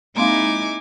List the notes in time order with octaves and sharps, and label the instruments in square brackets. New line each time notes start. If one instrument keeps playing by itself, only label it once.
[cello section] G#3 D#4 E4 [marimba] A#3 C4 F5 [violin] G#5 D6